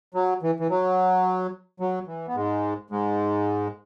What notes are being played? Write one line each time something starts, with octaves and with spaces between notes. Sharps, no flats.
F#3
E3
E3
F#3
F#3
E3
B3
G#2 G#3
G#2 G#3